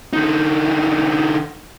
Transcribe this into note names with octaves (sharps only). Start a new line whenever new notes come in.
D3 D#4